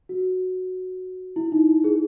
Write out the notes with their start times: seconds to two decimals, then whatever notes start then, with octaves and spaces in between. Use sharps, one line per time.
0.09 F#4
1.36 E4
1.52 D#4
1.68 E4
1.84 G#4